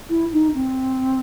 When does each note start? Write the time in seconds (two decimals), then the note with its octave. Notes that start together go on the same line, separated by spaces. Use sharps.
0.10 E4
0.33 D#4
0.55 C4